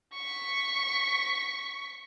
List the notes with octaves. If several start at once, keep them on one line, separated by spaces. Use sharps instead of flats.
C#6 B6